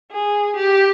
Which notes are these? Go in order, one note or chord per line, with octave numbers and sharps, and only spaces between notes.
G#4
G4